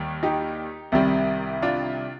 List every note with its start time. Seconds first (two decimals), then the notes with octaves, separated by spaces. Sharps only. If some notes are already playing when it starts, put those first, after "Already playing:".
Already playing: D#2 D#3 G3
0.23 D#4 G4
0.92 C2 C3 D#3 G3
1.62 D4 F4